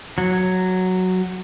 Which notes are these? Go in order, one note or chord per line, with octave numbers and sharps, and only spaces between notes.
F#3